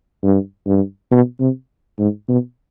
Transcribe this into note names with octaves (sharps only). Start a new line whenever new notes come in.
G2
G2
B2
C3
G#2
B2